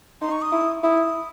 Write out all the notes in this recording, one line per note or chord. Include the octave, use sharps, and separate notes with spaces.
D#4 C6
C#6
D#6
E4
E4 D#6